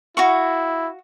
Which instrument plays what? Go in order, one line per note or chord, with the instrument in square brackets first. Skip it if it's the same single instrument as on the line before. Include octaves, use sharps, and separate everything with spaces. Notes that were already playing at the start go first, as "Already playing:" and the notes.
[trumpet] E4 [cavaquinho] F#4 F5 C#6